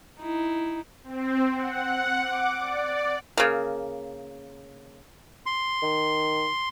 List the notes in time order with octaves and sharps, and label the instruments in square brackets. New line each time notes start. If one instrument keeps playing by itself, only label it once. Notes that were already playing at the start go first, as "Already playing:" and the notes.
[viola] D#4 E4
[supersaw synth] C4
F#5
D6
D5
[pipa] C#3 A#3
[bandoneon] C6
[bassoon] D#3